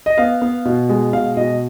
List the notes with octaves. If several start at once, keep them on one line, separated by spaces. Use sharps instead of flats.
D#5
B3 F5
B3
B2
G#3
B2 F5
B2 D#5